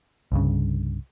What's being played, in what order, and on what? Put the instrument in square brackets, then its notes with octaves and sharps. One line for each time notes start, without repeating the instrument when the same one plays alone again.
[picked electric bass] C2 G2 C#3